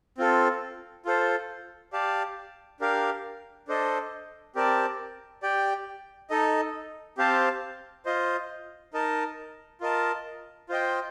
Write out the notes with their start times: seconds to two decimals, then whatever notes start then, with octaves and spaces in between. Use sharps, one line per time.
0.18 C4 F4 A4
1.05 F4 A4 C5
1.93 G4 D5 F5 A5
2.80 D4 G4 A#4 F5
3.68 D4 A4 C5 D#5
4.55 C4 G4 A#4 D5 A5
5.42 G4 D5 G5
6.30 D#4 A4 D#5
7.18 C4 G4 C5 F5 A5
8.05 F4 C5 D#5
8.93 D#4 A#4 D#5 A5
9.81 F4 A#4 D#5 A5
10.69 F4 C5 D#5 G5